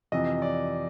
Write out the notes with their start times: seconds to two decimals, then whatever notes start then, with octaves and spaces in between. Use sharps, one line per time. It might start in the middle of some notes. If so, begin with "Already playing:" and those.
0.12 F2 C3 E3 D#5
0.42 D5